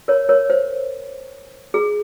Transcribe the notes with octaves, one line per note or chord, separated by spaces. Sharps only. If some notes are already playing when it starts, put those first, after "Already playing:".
A#4 C#5
A#4 C#5
C5
G#4